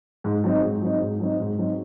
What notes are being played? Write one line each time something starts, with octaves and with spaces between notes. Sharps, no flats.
G#2
F#3 C4 D#4
G#2
F#3 C4 D#4
G#2
F#3 C4 D#4
G#2
F#3 C4 D#4